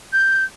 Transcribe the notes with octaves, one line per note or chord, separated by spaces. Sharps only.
G6